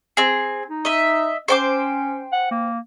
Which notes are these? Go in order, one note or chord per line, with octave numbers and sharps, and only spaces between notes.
C4 G#4
D#4
D#5 E5
C#4 C5 G5 D6
F#5
A#3